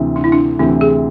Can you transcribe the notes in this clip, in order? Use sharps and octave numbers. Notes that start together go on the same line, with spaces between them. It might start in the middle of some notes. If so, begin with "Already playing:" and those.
Already playing: D2 C3 E3
D4
E4
D4
D2 C3 E3 E4
G#4